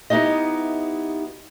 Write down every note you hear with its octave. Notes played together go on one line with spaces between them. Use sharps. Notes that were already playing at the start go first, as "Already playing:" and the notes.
B3 D#4 E4 G4 D#5